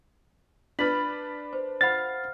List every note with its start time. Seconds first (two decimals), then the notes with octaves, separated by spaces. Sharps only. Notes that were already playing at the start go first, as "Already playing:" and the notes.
0.79 D4 B4 B5 F6 A6 F#7
1.53 C5
1.81 C5 F5 F#5 B5 A6